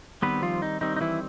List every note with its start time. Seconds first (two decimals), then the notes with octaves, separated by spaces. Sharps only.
0.22 D#3 G3 B3 C4 B4
0.42 F3 F4
0.62 D#4
0.81 D#3 G3 C4 D#4
0.96 D#4
1.01 E3 E4